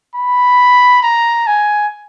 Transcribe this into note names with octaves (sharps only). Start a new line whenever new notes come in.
B5
A#5
G#5